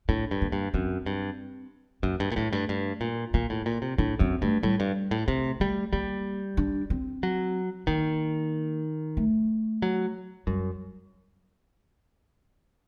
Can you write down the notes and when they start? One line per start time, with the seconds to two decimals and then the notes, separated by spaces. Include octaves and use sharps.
0.09 A2 D4
0.31 G2
0.42 A#3
0.52 G2
0.74 F#2 C4
1.06 G2
2.03 F#2 A#3
2.20 G2
2.32 A#2
2.36 A2 A3
2.53 G2
2.69 G2
3.01 A#2
3.34 A#2 A#3
3.50 A2
3.66 A#2
3.82 C3
3.98 A2 D4
4.19 F#2 C4
4.42 G2 A3
4.63 A2 G3
4.80 G2
5.11 A2
5.28 C3 A3
5.60 G3 A3
5.93 G3 A#3
6.57 D4
6.90 C4
7.23 F#3
7.87 D#3 A#3
9.17 A3
9.82 F#3
10.47 F#2 G3